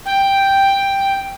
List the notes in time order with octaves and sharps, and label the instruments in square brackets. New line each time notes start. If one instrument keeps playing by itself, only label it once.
[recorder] G5